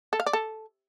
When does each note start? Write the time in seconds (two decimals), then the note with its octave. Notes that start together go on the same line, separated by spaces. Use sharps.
0.13 A4
0.20 F5
0.26 D5
0.33 A4